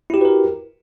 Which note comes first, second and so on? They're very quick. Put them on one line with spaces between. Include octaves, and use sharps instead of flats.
E4 G4 F#4 B4 A#4